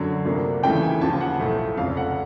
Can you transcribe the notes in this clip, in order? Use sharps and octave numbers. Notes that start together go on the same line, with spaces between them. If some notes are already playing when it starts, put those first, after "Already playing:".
Already playing: F#2 D3 F#3
D2 C3 F3 A#3 D4
D#2 C#3 E3 A3 G5
G#5
D#2 C#3 F3 A5
F#5
B1 A2 F3 A3
F1 F2 C#3 F5
F#5